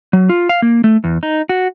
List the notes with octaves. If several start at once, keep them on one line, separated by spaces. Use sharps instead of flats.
F#3
F4
F5
A#3
A3
E2
D#4
F#4